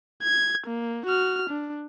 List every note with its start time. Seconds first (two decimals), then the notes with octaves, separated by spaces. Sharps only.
0.23 G#6
0.67 A#3
1.06 F#4 F6
1.49 D4